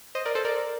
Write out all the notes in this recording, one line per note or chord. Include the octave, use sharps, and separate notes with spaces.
C5 D#5
A#4 D5
A4 C5
A#4 D5